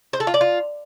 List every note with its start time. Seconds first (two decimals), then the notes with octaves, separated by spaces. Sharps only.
0.13 C5
0.20 A4
0.27 F4
0.34 D5
0.41 F4